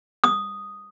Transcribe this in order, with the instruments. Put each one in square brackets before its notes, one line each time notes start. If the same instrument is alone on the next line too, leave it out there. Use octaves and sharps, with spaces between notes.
[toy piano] D#6